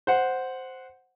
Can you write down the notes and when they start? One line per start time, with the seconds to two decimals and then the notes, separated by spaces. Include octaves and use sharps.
0.07 C5 F#5